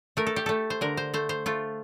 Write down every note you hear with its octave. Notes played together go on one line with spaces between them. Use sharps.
A3 A#4
A4
G4
A3 A4
C5
D3 A#4
C5
A3 C5
C5
A3 F4